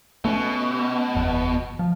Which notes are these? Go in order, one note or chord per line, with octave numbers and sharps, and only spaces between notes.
B2 A3 C#4
F#1 E2
F3